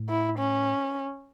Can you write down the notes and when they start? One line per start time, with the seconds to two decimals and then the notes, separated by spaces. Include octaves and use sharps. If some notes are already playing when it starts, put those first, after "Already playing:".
Already playing: A2
0.09 E4
0.38 C#4